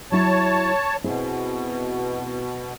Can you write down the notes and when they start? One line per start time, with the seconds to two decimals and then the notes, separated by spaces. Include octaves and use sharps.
0.12 F#3 E4 C#5 A5
1.04 B2 C4 E4 G#4